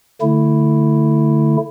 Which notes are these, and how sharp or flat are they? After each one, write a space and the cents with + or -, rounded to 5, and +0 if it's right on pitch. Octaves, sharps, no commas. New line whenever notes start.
D3 +0 A3 +10 E4 +0